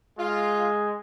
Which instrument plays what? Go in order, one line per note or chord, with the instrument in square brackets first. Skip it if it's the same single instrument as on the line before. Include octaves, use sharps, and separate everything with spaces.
[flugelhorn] G#3 [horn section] F4